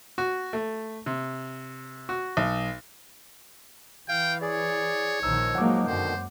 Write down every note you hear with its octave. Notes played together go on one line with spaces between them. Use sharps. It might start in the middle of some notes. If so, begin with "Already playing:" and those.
F#4
A3
C3
F#4
B1
E3 F5 G5
G#4 C#5 D5
A#1 D#3 F3 D#4 E6
F#3 G#3 A#3 F#5 D6
F#2 B2 D3 D#3 C5